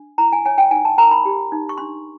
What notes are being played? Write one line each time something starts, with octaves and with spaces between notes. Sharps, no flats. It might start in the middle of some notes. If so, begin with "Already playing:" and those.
Already playing: D4
E4 A#5
G#5
C#5 G#5
G5
D#4 G#5
A5
A#4 A#5
B5
G4
D#4
C#6
D4 C6